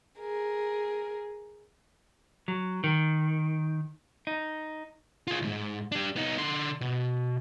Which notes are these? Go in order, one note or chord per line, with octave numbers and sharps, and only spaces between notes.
G#4 A#4
F#3
D#3
D#4
F4 G#4
C#2 G#2
D4 G4
B3 D#4
D3 C6
B2